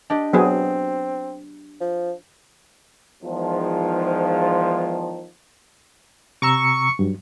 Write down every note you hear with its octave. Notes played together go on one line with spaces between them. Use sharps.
D4 G4 D#5
F#3 B3 C4 G#4
F3
E2 G#2 D#3 F3
C3 A#5 C#6 E6
G2 F#3